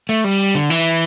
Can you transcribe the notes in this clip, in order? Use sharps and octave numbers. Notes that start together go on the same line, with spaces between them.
A3
G3
D3
E3